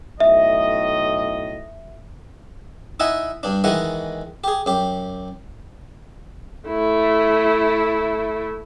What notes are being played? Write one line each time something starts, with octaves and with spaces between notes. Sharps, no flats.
B1 A2 D#5 E5
D#4 E4 D#5 E5 F#5 G#5
G2 D4
D#3 E3 G#3 E4 D#5 F#5
G4 G#4
F#2 G4
A3 E4